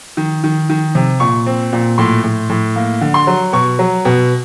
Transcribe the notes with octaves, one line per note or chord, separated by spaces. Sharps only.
D#3
D#3
D#3
C3
A#2 C#6
C4
A#2
A2 C6
A2
A2
A#3
D3
C6
F#3
B2 C#6
F#3
B2